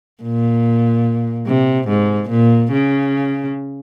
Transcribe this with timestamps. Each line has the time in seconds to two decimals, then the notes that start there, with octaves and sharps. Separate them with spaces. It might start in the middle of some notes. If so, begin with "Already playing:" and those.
0.23 A#2
1.47 C3
1.88 G#2
2.30 A#2
2.72 C#3